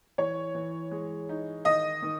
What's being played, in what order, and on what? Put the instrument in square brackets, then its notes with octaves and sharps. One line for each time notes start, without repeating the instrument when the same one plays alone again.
[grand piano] E3 [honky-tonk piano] C#5
[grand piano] E3
G#3
D#4
[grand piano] D#3 [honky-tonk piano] D#5
[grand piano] D#3